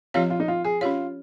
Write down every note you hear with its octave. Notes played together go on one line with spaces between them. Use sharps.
F3 C4 F4 G4 C#5
F4
D#4
F4
G#4
C#4 F4 G4 C#5